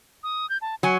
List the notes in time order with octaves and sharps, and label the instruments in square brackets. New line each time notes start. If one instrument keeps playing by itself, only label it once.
[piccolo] D#6
G6
A5
[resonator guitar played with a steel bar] F#3 G#5 [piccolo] C#7